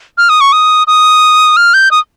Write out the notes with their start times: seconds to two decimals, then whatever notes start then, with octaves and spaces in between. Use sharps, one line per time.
0.18 F6
0.29 D#6
0.41 C#6
0.52 D#6
0.87 D#6
1.57 F6
1.74 G6
1.91 D#6